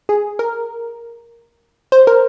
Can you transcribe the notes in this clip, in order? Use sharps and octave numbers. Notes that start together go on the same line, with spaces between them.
G#4
A#4
C5
A#4